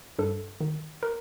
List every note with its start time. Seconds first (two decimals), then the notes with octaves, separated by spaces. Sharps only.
0.19 G2 A4
0.61 D#3
1.03 A#4